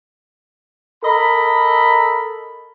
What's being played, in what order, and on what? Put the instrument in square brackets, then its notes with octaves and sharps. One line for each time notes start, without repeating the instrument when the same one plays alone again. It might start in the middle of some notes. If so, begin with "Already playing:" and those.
[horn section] A4 A#4 D#5 B5